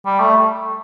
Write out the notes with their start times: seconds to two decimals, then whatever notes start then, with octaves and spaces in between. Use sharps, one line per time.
0.06 G3
0.19 A3